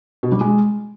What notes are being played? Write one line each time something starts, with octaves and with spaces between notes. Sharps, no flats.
B2
G3
G#3